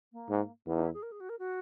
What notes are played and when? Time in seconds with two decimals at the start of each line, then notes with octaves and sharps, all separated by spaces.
0.12 A#3
0.30 G#2
0.66 E2 B3
0.76 D#4
0.84 E4
0.94 G#4
1.02 A#4
1.12 G#4
1.20 F#4
1.29 A#4
1.39 F#4